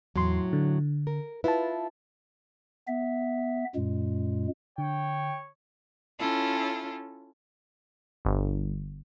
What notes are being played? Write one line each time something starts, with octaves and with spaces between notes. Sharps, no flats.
E2 A2 F#3 C6
D3
A#4
E4 F4 B4 A5
B3 E5
F#2 A#2 G#3
D3 C#5 G5
C#4 E4 F4 A4
G1